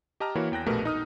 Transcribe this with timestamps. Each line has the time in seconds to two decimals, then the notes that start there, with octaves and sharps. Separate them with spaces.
0.20 G4 D#5 A5 A#5 F6
0.35 E3 A#3 E4 F#4 A#4 C#5
0.52 E2 G5 F#6 A#6
0.66 A#1 B2 A3 G4 A#4 B4
0.85 D#4 D#6 F6